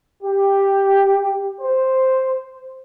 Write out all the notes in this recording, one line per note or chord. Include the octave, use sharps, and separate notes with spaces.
G4
C5